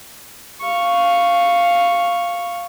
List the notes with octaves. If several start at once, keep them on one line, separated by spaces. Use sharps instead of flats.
F5 C#6